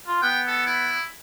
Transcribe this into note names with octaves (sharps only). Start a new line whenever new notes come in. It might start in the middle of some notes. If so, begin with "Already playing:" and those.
F4
B3 G5
A4
E4